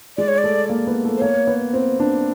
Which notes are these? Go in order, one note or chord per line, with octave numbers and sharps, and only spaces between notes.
G#3 D5
C#5
D5
A3
A#3
B3
A3
C5
A#3 C#5
B3
C4
D4